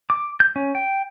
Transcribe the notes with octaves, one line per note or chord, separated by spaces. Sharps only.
D6
G6
C#4
G5